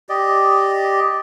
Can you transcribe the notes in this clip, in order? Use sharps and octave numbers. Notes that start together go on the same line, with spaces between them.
G4 D5 D#5